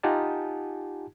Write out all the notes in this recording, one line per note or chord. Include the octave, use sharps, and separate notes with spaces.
D#4 F4 G4 F#5 G#5 A5